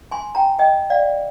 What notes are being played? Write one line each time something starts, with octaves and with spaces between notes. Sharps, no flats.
G#5 C6
G5 A#5
D#5 G5
D5 F5